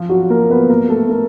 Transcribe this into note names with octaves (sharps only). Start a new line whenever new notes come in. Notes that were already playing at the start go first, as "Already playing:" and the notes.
Already playing: F3 F4
F#3 F#4
A#3 A#4
B3 B4
A#3 A#4
A3 A4
A#3 A#4